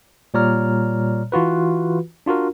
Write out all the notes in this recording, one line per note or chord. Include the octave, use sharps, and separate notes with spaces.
A#2 G3 C#5 D5 A#5 F6
E3 F4 F#4 B4
D4 F4 F#4 A#4